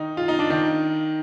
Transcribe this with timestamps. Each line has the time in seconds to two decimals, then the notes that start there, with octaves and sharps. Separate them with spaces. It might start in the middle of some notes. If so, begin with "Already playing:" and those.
Already playing: D#3 D#4
0.17 F4
0.28 D#4
0.39 D4
0.50 D#3 D#4